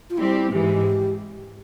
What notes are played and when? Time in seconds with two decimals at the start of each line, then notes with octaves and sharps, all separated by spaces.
0.10 F4
0.18 G3 C4 E4 G4
0.52 G#2 E3 G#3 G4